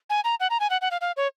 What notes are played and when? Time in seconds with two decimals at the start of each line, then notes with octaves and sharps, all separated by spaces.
0.10 G#5
0.24 A#5
0.40 F#5
0.50 A#5
0.60 G#5
0.70 F#5
0.81 F#5
0.91 F5
1.01 F5
1.17 C#5